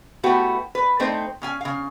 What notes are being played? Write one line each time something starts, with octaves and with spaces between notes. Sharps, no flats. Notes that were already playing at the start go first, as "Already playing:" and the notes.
A3 B3 E4 F#4 G4 B4
B4
A3 C4 D#4 C5
C#3 C#4 G#5
C#3 F5